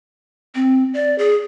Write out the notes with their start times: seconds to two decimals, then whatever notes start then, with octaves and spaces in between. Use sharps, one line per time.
0.55 C4
0.94 D5
1.18 G#4